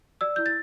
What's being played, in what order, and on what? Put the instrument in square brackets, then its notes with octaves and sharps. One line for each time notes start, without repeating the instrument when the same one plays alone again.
[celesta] D5 E6
E4 G6
A6